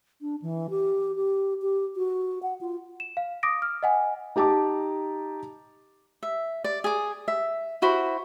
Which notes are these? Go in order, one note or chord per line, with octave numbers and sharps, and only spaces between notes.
D4
E3
G4
G4
G4
F#4
F#5
F4
E7
F5
D6 D#6 A#6 D7
F6
D#5 F#5 G#5
D#4 G4 A5 A#5 D6
E5
D5
G#4 D6
E5
E4 F#4 C5 B5